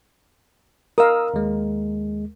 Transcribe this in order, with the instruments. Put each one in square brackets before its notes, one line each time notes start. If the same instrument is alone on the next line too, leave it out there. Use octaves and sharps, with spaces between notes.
[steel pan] A#4 F5 [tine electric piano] D#6 E6
[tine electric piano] D#2 G#3